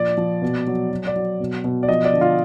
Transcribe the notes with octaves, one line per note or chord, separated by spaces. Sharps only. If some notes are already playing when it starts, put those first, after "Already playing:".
Already playing: A#2 F3 D5
F3
B2
F#3
F#3
D5
F#3
B2
B2
D5
F3 D#5
D5
D3
F4